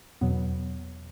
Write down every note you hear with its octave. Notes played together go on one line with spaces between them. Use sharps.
E2 B2 F#3 B3